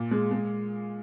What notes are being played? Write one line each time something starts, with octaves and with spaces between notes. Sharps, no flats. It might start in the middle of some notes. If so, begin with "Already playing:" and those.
Already playing: A#2
G#3
G#3